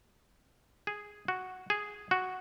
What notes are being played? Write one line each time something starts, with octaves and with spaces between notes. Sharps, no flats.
G#4
F#4
G#4
F#4